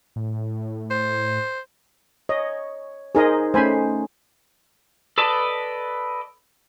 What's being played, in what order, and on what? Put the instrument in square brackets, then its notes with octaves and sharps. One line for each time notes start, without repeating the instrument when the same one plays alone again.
[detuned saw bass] A2
[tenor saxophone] C5
[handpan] C#5 [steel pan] D#5
[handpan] D#4 C5 [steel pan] G#4 A#4 D#5
[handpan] A3 C#4 [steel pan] C5 G#5 B5
[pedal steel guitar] A4 B4 D5 D#5 A5